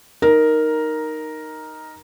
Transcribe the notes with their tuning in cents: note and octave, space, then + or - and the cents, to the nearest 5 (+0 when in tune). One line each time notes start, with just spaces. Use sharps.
D#4 +0 A#4 +0 A#5 +10